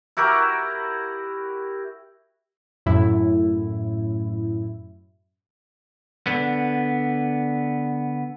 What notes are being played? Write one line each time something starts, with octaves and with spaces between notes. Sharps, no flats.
E4 F#4 G4 A#4
F#2 A2 E4
D3 B3